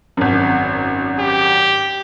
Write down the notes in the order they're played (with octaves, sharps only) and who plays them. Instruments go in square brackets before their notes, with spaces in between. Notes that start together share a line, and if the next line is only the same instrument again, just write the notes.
[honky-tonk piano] G#1 F#2
[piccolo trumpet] G4